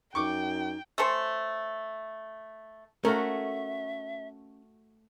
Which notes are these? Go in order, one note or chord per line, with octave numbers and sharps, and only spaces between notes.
F#2 D#4 G5 C#6 D6
A3 C#4 A4 C5
A3 C#4 F#4 A#4 E5